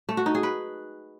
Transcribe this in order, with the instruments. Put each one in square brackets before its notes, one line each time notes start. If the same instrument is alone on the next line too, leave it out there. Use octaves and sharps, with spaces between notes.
[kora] A3
F#4
D#4
G#4
B4